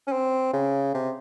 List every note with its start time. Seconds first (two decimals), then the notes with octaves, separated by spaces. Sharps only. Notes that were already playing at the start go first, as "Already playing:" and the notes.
0.07 C#4
0.12 C4
0.53 C#3
0.94 C3